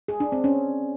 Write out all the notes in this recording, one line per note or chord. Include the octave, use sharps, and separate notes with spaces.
G#4
D4
C4
C#4